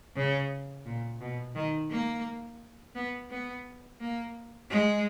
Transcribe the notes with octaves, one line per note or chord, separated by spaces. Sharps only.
C#3
A#2
B2
D#3
A#3
B3
B3
A#3
G#3